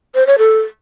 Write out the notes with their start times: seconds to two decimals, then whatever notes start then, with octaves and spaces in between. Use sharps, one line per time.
0.15 C5
0.27 C#5
0.38 A4